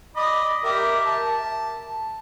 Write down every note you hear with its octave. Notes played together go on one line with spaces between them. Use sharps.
D5 D#5 B5
G4 A#4 E5
A5